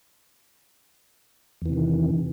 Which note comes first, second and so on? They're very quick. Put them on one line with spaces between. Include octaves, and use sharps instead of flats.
E2 E3 C3 D#3